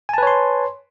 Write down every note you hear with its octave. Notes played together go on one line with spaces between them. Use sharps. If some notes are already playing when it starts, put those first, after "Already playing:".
B4 C#5 G#5 A5 C6